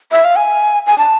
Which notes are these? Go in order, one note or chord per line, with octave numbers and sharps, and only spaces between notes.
E5
F5
G#5
G#5
A5